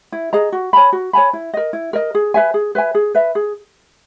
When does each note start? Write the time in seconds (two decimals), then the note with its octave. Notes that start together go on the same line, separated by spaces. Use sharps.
0.12 E4
0.33 G#4 D#5 A#5
0.52 F#4
0.73 C#5 G#5 B5
0.93 F#4
1.13 C#5 G#5 B5
1.33 E4
1.54 A#4 D#5
1.73 E4
1.93 A#4 D#5
2.15 G#4
2.34 B4 E5 G#5
2.54 G#4
2.75 B4 E5 G#5
2.95 G#4
3.15 B4 E5
3.35 G#4